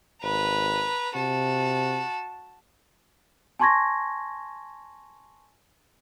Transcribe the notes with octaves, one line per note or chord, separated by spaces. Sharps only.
G#1 B4 A#5
C3 F#4 A5
G#5 A5 C6 C#6 G#6 A#6